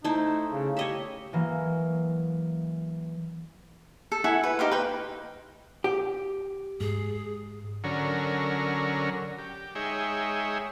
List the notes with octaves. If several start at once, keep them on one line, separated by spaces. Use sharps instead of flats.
A3 D#4 E4 C5
C#3
G4 C#5 D#5 E5
E3 F#3 G#3 A#3
A4
E4 F#5 G#5
B4
D#4 G4 C5 F5
B4 G5
G4
G#2 G#4
D3 F#3 C#4 A#4
G4
G#3 D#4 G#4 C#5 E5 G5